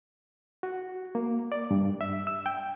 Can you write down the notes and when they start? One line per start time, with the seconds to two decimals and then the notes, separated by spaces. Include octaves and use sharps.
0.63 F#4
1.15 A#3
1.52 D5
1.71 G2
2.01 E5
2.27 E6
2.46 G5